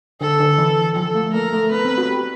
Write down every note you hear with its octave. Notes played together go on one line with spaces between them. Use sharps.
D3 A4
D3
E3
F3 A4
A3
A#3 A#4
A3
B3 B4
C4
F#4
G4